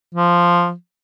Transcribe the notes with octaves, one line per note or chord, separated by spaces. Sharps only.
F3